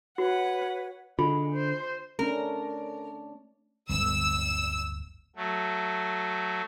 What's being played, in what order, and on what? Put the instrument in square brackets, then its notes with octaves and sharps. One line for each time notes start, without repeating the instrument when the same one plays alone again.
[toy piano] F#4 [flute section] B4 C#5 [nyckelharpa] F#5
[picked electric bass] D3 [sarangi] G#3 [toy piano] F4
[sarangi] C5
[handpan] A3 C#4 D4 [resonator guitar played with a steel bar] A#4
[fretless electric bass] D1 G1 [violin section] E6
[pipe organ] F#3 A3